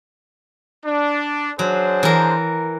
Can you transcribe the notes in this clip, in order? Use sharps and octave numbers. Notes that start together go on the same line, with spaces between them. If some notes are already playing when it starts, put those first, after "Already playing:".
D4
F#3 D4 G#4 C5
E3 A#4